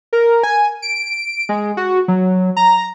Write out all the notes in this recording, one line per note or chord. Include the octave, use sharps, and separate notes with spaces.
A#4
G#5
D7
G#3
F#4
F#3
A#5